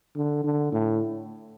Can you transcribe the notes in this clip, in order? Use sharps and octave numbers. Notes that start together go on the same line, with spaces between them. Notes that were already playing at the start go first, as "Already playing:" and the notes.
D3
D3
A2